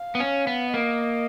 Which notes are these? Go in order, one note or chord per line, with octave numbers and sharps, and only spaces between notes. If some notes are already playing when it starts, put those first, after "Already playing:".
Already playing: F5
B3
C#4
B3
A#3 D#5